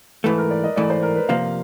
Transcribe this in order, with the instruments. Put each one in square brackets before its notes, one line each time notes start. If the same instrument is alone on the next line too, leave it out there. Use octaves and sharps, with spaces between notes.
[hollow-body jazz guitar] G#2 E3 A3 [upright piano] B4
[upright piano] A#4
D5
D#5
[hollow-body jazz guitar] G#2 E3 A3 [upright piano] D5
[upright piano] C5
A#4
B4
[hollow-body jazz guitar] C3 F3 A#3 [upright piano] F5